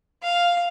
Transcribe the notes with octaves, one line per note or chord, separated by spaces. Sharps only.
F5